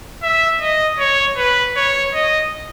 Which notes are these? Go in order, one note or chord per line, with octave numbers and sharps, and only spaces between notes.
E5
D#5
C#5
B4
C#5
D#5